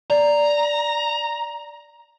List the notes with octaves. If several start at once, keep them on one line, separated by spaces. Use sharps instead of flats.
D5 A#5